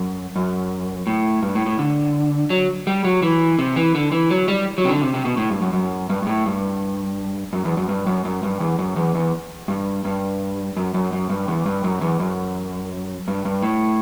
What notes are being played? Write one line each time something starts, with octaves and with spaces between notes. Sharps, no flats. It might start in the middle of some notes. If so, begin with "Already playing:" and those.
Already playing: F#2
F#2
A2
G2
A2
A2
D3
F#3
G3
F#3
E3
C3
E3
D3
E3
F#3
G3
F#3
C3
D3
C3
C3
B2
A2
G2
F#2
F#2
G2
G2
A2
G2
F#2
E2
F#2
G2
F#2
F#2
G2
E2
F#2
E2
E2
G2
G2
F#2
F#2
F#2
G2
E2
G2
F#2
E2
F#2
G2
G2
A2